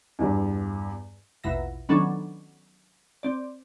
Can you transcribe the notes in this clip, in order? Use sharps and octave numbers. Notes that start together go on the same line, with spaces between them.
E2 G2
A#1 E2 B2 E5 A#6
D#3 F#3 B3 C#4 D4 A4
C4 D5